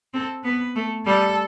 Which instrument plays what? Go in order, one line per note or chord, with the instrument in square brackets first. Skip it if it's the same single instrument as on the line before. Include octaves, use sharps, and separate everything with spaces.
[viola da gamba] C4 [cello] A4
[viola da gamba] B3 [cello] B4
[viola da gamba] A3
[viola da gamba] G3 [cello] A4